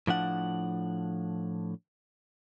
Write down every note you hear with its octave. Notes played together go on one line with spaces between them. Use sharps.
A2 F3 D4 F#5